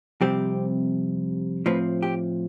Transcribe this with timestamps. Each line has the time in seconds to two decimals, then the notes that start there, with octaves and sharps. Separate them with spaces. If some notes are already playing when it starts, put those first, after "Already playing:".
0.21 F2 C3 G3 C4 G4
1.66 A2 F3 C4 B4
2.03 G4